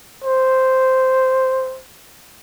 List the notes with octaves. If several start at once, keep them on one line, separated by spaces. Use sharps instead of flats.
C5